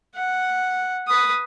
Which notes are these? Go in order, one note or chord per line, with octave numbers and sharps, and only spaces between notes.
F#5
B4 D#6